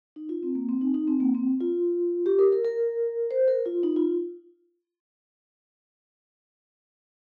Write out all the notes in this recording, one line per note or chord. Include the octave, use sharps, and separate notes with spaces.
D#4
F4
C4
A#3
C4
D#4
D#4
C4
A#3
C4
F4
G4
A#4
A#4
A#4
C5
A#4
F4
D#4
F4